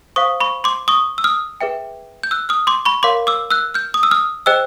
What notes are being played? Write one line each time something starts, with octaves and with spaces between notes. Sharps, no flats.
C5 F5 C#6 D#6
B5 C#6
C6 D6
C#6 D#6
E6
D#6 F6
G#4 B4 E5 G5
G6
E6 F#6
D#6 F6
C6 D6
B5 C#6
A#4 C#5 F5 C6 D6
D6 E6
E6 F#6
F6 G6
D#6
E6
D#6 F6
G#4 C5 D#5 G5 E6 F#6